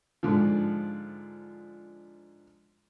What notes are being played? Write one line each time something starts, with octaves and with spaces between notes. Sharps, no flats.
G#2 D3 F3